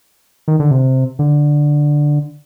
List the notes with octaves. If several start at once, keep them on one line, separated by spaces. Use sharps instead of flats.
D#3
D3
C3
D3